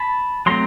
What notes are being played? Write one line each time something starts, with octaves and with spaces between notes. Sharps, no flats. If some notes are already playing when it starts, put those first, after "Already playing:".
Already playing: A5 B5
F#3 A3 C4 A#5 C6